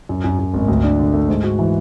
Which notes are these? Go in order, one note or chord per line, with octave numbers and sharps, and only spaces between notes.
F#2
F#2
F#2
G#1
D2
D4
D3
A3
G#2
F#4
E3